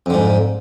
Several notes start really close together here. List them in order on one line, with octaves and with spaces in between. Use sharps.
F2 D3 G#2